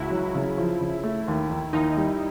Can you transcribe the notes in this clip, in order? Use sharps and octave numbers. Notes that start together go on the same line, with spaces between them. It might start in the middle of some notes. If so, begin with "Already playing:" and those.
Already playing: C#2 E4 F#4
F#3
C#3
F3
C#3
A3
D#2
D#3
D#2 D#4
G3